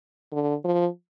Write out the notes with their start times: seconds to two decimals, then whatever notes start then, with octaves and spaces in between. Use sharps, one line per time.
0.32 D3
0.64 F3